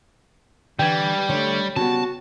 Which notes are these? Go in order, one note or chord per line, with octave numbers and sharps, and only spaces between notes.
D3 E3 G3 G5 G#6
D3 A3 C#5
C#3 G3 B3 F#4 A5